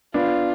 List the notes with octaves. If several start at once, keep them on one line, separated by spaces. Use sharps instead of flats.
B3 D4 F4